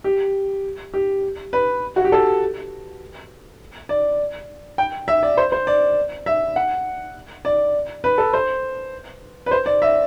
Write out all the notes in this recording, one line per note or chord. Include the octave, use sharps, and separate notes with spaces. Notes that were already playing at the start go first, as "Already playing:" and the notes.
G4
G4
B4
F#4
G4
A4
D5
G5
E5
D5
C5
C5
D5
E5
F#5
D5
B4
A4
C5
B4
C5
D5
E5